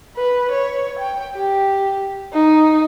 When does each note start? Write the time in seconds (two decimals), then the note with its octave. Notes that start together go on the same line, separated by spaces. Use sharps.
0.16 B4
0.51 C#5
0.99 G5
1.36 G4
2.33 D#4